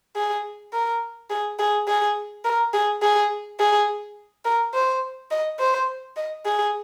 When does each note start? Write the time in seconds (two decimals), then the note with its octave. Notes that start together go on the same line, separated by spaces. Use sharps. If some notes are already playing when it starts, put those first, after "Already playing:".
0.16 G#4
0.73 A#4
1.30 G#4
1.59 G#4
1.88 G#4
2.45 A#4
2.74 G#4
3.02 G#4
3.59 G#4
4.45 A#4
4.74 C5
5.31 D#5
5.60 C5
6.17 D#5
6.46 G#4